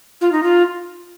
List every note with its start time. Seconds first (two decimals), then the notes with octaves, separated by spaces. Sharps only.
0.21 F4
0.32 D#4
0.43 F4